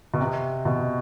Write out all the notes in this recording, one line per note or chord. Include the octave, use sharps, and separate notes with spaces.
B2
C3
B2